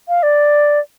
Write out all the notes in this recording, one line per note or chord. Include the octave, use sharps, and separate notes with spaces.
F5
D5